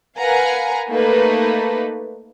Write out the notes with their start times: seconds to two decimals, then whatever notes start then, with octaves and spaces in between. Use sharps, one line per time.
0.18 A#4 B4 F5 F#5 G#5 A#5
0.89 A3 A#3 D#4 A4 B4